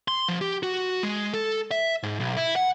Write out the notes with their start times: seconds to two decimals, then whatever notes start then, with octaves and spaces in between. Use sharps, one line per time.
0.08 C6
0.28 F3
0.41 G4
0.63 F#4
1.03 G#3
1.34 A4
1.71 E5
2.03 G#2
2.20 B1
2.37 E4
2.56 F#5